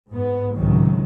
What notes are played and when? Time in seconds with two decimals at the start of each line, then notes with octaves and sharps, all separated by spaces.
0.12 G#2 B3
0.56 C#2 A2 C3 D#3 F#3